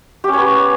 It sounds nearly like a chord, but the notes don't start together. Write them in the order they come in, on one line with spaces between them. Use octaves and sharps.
G4 C#4 C#5 B3